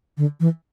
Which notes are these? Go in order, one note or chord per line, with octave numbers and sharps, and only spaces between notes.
D3
E3